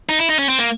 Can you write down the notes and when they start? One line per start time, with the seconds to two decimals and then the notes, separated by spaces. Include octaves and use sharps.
0.09 D#4
0.19 E4
0.29 D#4
0.39 C#4
0.49 C4
0.59 A#3